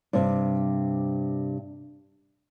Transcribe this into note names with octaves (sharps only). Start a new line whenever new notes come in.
G2 C3